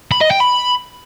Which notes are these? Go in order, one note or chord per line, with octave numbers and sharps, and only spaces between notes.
B5
D#5
G5
B5